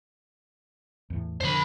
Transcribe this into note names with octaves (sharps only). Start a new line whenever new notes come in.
E2 A2
F2 B2 D3 C5 B5